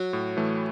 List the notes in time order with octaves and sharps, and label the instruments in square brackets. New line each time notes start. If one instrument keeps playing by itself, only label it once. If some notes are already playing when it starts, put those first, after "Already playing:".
Already playing: [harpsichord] F#3
[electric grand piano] A2
E3 A3